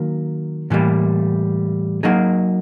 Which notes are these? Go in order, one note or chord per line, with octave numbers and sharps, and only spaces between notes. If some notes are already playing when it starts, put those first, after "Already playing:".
Already playing: D#3 F#3 A#3
A2 E3 G3 A#3
F#3 A#3 D#4 G#4